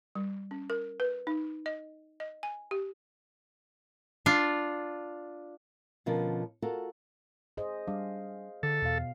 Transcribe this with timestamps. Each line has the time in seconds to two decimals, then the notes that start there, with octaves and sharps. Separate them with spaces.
0.15 G3
0.51 C#4
0.70 A#4
1.00 B4
1.27 D#4
1.66 D#5
2.20 D#5
2.43 G#5
2.71 G4
4.26 D4 F4
6.06 B2 D3 F3 C#4 A#4
6.62 F4 F#4 A4 A#4
7.57 G#4 C5 D#5
7.87 G3 D4 F5
8.63 D3 A4
8.82 E2 B2 F5